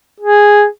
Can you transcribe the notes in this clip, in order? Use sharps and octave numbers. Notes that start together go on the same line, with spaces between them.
G#4